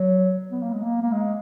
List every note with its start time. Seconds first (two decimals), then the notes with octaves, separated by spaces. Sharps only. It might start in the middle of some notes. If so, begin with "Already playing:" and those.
Already playing: F#3
0.51 B3
0.63 A#3
0.73 G#3
0.83 A#3
1.02 A#3
1.12 G#3